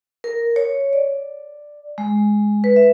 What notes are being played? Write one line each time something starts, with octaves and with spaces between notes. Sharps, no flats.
A#4
C#5
D5
G#3
B4
E5